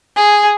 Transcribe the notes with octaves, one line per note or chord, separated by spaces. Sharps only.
G#4